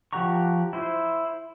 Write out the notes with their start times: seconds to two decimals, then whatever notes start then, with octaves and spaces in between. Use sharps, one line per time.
0.13 F3 G4 F#5 A#5 C#6
0.73 E4 C5